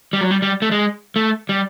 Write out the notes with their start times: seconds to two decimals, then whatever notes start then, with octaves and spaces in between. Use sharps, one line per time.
0.13 G3
0.21 F#3
0.31 G3
0.42 G3
0.62 A3
0.71 G#3
1.16 A3
1.49 G3